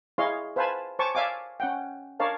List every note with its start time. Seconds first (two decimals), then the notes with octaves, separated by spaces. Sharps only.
0.18 E4 G#4 C#5 D#5 F5 C6
0.56 B4 C5 F5 G#5 A5 B5
0.99 C5 C#5 G#5 A5 C#6 D6
1.15 D5 E5 F5 G#5 D6
1.60 C#4 F#5 G5
2.19 D4 A#4 C#5 D5 F5 A5